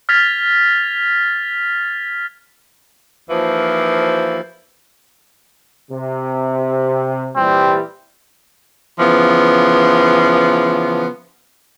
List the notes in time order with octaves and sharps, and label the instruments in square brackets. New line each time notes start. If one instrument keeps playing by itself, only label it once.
[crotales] F6 G#6 A6 B6 F7
[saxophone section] D#2 E3 F3
[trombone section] C3
[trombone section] A#2 E3 G3 [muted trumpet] C4
[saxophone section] C#3 E3 F3 B3